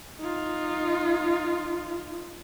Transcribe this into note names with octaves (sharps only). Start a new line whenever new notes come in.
D#4 F4